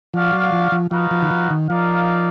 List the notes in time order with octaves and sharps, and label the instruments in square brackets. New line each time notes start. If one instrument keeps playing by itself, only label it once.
[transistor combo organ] F3 [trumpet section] F#4 D5 F5
[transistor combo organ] F#3
F3
F3
[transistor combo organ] F3 [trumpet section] B3 D#4 F#4 B4 F5
[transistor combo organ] F3
D#3
F3
D#3
[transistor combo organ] F3 [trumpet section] D#4 A#4 D5 F5